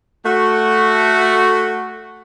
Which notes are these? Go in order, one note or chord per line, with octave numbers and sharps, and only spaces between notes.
A3 F#4